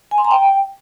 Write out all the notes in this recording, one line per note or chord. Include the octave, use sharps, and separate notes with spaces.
G#5
C6
A#5
G5